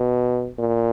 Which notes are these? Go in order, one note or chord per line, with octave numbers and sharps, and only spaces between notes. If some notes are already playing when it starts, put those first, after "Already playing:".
Already playing: B2
A#2